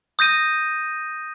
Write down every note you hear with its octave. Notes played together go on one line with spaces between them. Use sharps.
D#6 G6 A#6 D#7